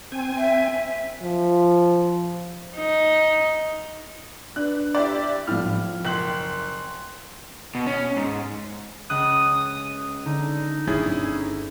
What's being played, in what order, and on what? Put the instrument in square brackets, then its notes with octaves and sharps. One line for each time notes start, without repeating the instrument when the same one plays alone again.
[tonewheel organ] C4 G#5
[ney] E5
[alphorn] F3
[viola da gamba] D#4
[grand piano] D4 B4 [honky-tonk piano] F#6
[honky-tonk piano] E4 G4 D5
[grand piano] A2 F3 [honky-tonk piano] F6
[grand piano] F3
[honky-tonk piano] F#1 F#7 [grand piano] G5 C6
[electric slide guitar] B2
C#4
G#2
[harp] C#2 [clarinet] D#6 [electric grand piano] F#6
[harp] D3 [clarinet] D#4
[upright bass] G1 [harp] D2 A6 [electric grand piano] C#4 E4 G#4